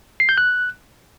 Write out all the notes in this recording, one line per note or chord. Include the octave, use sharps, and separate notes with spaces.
C7
G6
F#6